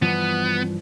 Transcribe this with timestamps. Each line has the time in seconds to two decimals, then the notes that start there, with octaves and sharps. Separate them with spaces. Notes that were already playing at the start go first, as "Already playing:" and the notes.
0.02 G2 E3 F3 B3